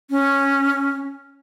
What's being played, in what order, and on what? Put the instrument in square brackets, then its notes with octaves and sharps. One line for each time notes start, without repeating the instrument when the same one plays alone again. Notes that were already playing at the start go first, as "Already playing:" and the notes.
[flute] C#4